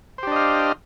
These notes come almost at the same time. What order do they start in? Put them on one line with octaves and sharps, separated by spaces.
C5 G4 D4 D#5 F5